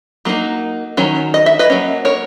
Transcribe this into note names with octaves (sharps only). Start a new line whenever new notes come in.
F#3 A#3 D#4
D#3 F#3 C#4
D#5
E5
B4 D#5
F#3 A#3 C#4
A#4 C#5